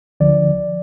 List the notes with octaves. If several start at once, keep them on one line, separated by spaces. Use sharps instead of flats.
D2 D3 F3 D5